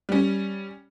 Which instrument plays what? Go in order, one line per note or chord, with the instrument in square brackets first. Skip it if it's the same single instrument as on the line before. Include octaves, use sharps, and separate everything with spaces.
[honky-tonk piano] G3 C#4